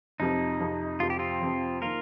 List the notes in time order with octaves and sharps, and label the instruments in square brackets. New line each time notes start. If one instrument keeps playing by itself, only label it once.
[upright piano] F2 C3 F3 [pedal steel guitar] D#4
[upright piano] F2 C3 F3
[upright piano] F2 C3 F3 [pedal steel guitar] F4
[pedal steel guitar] G4
C4 F4
[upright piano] F2 C3 F3
[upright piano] D#3 A#3 [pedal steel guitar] F4 A#4